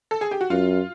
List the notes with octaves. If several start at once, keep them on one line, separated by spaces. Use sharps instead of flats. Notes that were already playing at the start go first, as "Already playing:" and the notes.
A4
G#4
G4
F#4
F#2 F4